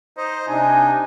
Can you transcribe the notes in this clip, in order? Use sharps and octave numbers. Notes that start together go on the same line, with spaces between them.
D#4 C5 D#5
C3 D4 D#4 G#5